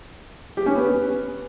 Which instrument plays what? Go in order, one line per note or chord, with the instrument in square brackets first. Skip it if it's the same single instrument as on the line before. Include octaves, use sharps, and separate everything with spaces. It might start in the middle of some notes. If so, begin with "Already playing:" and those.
[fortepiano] G4
C#4
B3